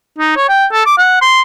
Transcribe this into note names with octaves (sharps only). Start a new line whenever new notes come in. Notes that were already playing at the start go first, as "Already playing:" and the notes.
D#4
C#5
G5
A4
D6
F#5
C6